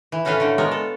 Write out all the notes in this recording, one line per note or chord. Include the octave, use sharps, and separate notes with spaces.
E3
A2 C#4 F#4 A4 B4 F5
D3 A3
G#3 B3 A#4 C#5
A4